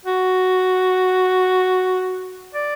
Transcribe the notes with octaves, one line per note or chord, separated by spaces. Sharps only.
F#4
D5